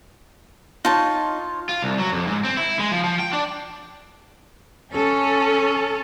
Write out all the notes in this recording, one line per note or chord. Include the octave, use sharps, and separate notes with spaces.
D#4 F4 C#5 A5
F4
C2
F#3
F2
G#2
C4
E4
G#3
F3
F3
G5
D4
C#4 A4